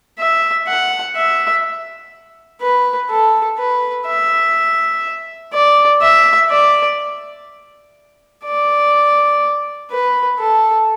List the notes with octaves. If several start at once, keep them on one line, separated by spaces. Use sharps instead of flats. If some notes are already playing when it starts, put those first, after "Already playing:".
E5
F#5
E5
B4
A4
B4
E5
D5
E5
D5
D5
B4
A4